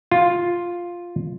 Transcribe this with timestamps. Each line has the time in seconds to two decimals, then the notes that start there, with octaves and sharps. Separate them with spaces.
0.11 F4